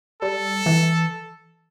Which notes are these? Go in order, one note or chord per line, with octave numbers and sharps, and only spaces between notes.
G3 A4
E3